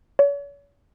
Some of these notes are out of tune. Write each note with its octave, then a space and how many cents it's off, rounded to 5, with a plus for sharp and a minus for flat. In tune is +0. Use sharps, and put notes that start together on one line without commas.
C#5 +40